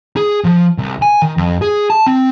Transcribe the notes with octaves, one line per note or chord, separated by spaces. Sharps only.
G#4
F3
C2
G#5
D#3
F2
G#4
A5
C4